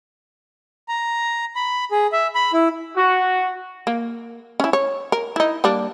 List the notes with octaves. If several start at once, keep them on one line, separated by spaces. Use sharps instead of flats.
A#5
B5
G#4
E5
B5
E4
F#4
A#3
C#4 E4
C#5
A#4
D#4 E4
G3 A#3 D4